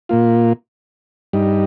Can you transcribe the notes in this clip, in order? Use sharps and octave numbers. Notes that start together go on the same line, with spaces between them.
A#2 A#3 F4
G2 G3 D#4